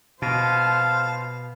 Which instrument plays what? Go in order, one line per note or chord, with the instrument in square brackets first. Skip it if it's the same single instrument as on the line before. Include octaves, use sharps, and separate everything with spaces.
[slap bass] B2 [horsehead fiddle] C5 A5 [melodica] F5